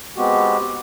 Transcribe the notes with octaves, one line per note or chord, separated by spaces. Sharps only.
G#3 B3 C4 F#4 G4